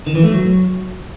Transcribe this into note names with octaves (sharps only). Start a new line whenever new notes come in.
D#3
E3
A3
F#3